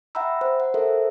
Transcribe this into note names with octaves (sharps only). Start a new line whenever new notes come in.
E5 F#5 G5 A#5 B5 E6
C5
F#5
A4 A#4 C5 E5